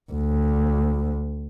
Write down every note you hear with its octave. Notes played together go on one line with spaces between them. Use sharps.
D2